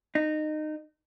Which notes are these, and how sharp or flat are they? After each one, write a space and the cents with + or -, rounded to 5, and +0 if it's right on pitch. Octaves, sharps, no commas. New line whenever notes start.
D#4 -20